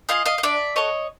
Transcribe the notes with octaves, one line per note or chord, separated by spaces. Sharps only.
F4 G#4 D#5 F5
D#5 F5
D#5
D4 D5 E5
F#4 A4 C#5 D#5